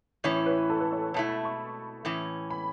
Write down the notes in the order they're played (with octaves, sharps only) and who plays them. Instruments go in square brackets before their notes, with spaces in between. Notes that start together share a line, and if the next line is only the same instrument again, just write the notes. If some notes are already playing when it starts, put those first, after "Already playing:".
[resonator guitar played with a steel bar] A2 E3 C#4 E4 [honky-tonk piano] C#5
[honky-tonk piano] B4
A4
B4
C#5
[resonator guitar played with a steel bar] B2 A3 E4 [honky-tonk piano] A5
[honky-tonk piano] B5
C#6
[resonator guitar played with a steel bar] A2 E3 C#4
[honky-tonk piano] B5